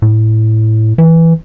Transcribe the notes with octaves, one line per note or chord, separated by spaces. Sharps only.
A2
E3